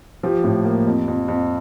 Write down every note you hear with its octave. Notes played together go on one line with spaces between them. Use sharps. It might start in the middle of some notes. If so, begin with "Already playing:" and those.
F3 G4
A2
A#3
F2
F2
F2